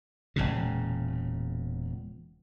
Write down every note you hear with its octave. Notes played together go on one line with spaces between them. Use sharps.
E1 A#1 A#2 C#3